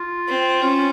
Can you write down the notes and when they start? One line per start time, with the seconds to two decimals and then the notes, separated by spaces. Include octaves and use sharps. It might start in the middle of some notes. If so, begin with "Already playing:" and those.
Already playing: F4
0.28 C4
0.62 C#4 F4